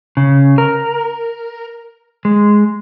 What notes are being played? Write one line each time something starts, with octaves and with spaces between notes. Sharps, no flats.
C#3
A#4
G#3